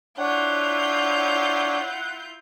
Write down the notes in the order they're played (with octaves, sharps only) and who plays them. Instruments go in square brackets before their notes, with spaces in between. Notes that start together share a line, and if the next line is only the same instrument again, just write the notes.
[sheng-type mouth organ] D4 C#5 [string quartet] E4 F4 G6 [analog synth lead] F#5